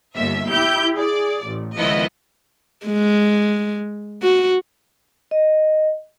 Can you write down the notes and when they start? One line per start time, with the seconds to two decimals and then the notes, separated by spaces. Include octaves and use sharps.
0.16 G1 D#2 E5
0.49 E4 G4 G6
0.95 G#4 D5
1.44 A1
1.78 C#2 D#3 F3 B3 E4 D#5
2.86 G#3
4.22 F#4
5.31 D#5